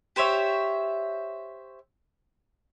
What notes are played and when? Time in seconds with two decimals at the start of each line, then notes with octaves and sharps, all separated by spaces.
0.16 G4 C5 C#5 E5